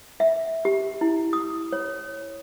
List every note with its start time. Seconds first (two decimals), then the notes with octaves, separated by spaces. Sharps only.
0.20 E5
0.65 G4
1.01 E4
1.33 D#6
1.73 C#5